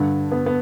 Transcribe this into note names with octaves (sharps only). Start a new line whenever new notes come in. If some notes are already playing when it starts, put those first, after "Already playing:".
Already playing: G2 D3
B3
B3